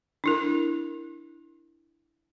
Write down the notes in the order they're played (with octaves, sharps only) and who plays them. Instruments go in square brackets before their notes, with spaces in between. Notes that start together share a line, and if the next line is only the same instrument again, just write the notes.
[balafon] D4 E4 A#4